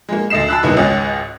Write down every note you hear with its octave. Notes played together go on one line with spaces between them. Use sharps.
G#3 A#3
D2 A4 D#5 C7 E7
A5 B5 E6 F#6
E2 G2 C3 A#3 B3 D#4
G#1 C#2 C#4 D#5